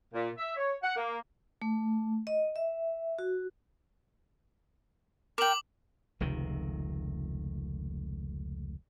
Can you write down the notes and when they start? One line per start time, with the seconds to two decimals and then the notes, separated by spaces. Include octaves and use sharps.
0.14 A#2
0.38 E5
0.57 C#5
0.83 F#5
0.97 A#3
1.62 A3
2.27 D#5
2.56 E5
3.19 F#4
5.38 A#4 G5 D6 F#7
6.20 F1 C#2 C3 D#3